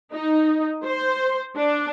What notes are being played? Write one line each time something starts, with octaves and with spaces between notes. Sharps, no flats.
D#4
C5
D4